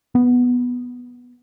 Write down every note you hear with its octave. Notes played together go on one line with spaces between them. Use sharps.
B3